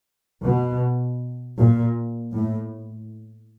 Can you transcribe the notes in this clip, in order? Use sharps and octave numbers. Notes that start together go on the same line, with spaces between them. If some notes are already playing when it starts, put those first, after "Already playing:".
B2
A#2
A2